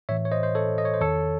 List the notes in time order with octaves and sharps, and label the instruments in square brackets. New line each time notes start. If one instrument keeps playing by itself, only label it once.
[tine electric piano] A2 E3 C#5 E5
C#5
C5 D#5
C5
A4 C#5
D#5
C#5
C5
E2 D#3 A4 C#5